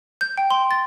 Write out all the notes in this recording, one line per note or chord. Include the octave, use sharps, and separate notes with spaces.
G6
G5
C6
A6